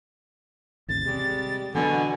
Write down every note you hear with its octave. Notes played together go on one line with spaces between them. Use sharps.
A1 D#2 C#3 A6
C3 G3 G#3
B2 D3 E3 F#3 B3 G#5